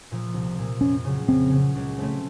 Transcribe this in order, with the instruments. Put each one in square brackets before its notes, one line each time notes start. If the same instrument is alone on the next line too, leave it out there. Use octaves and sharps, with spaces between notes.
[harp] A#2 F3 A#3
C2
A#2 F3 A#3
[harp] F2 [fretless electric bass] C#4
[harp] C#3 F#3
[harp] F2 [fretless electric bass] C4
[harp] C#3 F#3
C#2
C#3 A3 C4